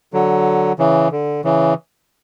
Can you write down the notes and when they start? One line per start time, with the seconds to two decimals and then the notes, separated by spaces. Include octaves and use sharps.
0.13 D3 F#3
0.79 C#3 E3
1.12 D3
1.44 C#3 E3